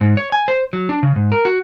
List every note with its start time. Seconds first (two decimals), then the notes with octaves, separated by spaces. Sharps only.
0.01 G#2
0.17 C#5
0.32 G#5
0.48 C5
0.73 F#3
0.89 D4
1.03 C#3
1.16 G#2
1.32 A#4
1.45 F#4